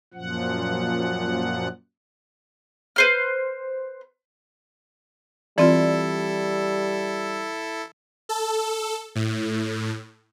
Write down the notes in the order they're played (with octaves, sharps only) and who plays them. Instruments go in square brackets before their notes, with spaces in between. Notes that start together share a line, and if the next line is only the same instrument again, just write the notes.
[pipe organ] F#2 A#2 F3 F#5
[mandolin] B4 C5 F6
[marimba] E3 C4 F4 [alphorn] G3 [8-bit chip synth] E4 A4 [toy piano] D5
[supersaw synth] A4
A2